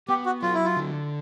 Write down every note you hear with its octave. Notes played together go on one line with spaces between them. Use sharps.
B3 G4
F#4
F#3 F4
E4
F4
D3